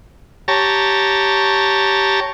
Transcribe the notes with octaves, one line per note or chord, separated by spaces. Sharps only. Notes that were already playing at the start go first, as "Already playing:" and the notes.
G4 C#5 A5 A#5